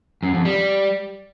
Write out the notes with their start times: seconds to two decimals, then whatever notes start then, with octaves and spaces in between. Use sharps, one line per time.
0.23 F#2
0.34 F2
0.45 G3